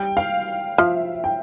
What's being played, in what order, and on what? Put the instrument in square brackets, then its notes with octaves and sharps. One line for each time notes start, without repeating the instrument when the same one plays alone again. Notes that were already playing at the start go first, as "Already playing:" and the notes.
Already playing: [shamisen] G3 [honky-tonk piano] G5
[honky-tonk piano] F5
[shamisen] F3 [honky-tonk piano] E5
[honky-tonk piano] G5